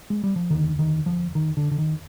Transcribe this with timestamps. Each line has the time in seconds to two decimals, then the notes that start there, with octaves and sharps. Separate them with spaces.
0.10 G#3
0.24 G3
0.36 F3
0.50 F1 D#2 D3 D#3
0.79 D#3
1.06 F3
1.35 D#3
1.57 D3
1.71 D3
1.78 D#3